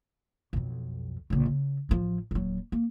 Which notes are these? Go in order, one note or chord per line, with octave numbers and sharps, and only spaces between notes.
B1 F2
A#1 C#3
C#3
A1 F3
D#1 F#3
A#3